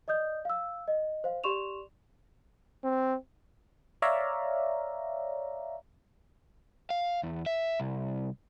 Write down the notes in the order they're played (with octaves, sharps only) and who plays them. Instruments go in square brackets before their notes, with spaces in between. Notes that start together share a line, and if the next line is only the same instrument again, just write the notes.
[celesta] D5 D#5 D#6 G6
F5 E6
D#5
C5 F5
G4 D5 C6 C#6 E7 F7
[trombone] C4
[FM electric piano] C#5 D5 E5 F5 A#5
[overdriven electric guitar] F5
E2
E5
C2